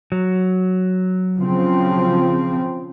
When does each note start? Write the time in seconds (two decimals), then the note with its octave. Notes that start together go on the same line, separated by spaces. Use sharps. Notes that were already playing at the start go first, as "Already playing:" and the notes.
0.12 F#3
1.37 C#3 F3 C4